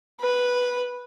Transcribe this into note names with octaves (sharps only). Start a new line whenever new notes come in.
B4